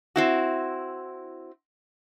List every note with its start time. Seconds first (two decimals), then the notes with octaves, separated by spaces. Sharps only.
0.16 C4 E4 F#4